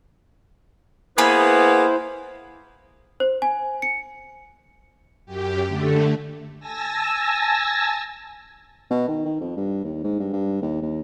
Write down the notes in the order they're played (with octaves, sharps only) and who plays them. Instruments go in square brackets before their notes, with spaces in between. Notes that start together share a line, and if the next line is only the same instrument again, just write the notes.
[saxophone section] A#3 B3 [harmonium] E4 C5 [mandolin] G#4 B5
[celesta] C5
G#5
C#7
[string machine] F#2 G4
D3 A3
G#5 A5 E6 A#6
[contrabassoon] B2
D#3
D#3
F2
G2
D#2
G#2
G2
G2
D#2
D#2